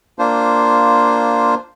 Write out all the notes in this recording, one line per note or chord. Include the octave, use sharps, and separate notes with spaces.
A#3 D4 F4 C5